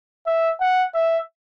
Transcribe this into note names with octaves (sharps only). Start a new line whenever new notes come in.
E5
F#5
E5